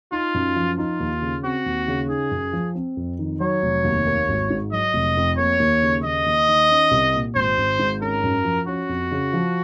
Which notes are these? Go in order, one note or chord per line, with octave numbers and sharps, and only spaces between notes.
D#4 F4
F#2
F3
D#4 F4
D#2
C#3
C4 F#4
D#2
C#3
D#4 G#4
F#2
F3
C4
F2
D#3
F#3 C#5
F1
D#2
A#3
G#1
G#2
F#3 D#5
F1
F2
A#3 C#5
D#2
C#3
D#2 D#5
D#2
D#3
C#4
C2
A#2
G#1 C5
G#1
G#2
C#4 A#4
F#2
F3
C#4 F#4
F2
C#3
F3